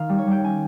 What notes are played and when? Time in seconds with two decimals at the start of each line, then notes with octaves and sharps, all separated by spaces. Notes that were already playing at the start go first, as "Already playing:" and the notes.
Already playing: D#3 F5
0.09 G3
0.18 C#5
0.27 G3 G5
0.44 C#4 G#5